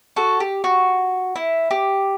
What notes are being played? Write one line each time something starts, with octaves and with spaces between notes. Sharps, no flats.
F#4 A4
G4
F#4
E4
G4